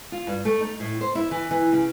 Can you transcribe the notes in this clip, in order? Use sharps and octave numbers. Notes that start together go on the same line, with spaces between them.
F4
G2
A3
D#4
A2
C5
E4
E3
E3
C#3